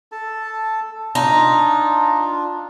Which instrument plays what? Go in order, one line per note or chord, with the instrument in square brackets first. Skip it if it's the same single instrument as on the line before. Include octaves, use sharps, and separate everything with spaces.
[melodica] A4 A5
[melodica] D4 F4 [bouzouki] D#4